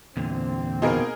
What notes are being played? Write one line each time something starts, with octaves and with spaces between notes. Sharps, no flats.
E2 A#2 D3 C4
B2 A#3 D#4 G#4 A#4